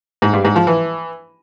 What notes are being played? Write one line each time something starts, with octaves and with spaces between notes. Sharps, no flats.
G#2
G2
G#2
F3
E3